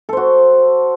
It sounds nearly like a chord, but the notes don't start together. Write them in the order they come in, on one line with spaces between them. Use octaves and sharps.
A4 C5 F#4